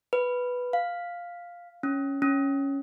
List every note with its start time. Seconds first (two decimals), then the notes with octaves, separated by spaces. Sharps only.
0.13 B4
0.73 F5
1.83 C#4
2.22 C#4